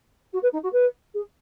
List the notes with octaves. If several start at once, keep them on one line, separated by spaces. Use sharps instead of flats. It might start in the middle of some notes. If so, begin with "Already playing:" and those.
F#4
B4
D#4
F#4
B4
G#4